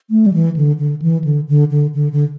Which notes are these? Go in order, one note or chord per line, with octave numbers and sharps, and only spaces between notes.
A3
G3
E3
D3
D3
E3
D3
D3
D3
D3
D3